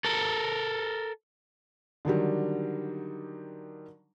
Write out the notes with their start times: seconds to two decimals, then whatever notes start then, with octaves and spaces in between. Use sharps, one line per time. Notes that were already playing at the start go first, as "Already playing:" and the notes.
0.05 A4 A#4
2.05 D3 D#3 F#3 G3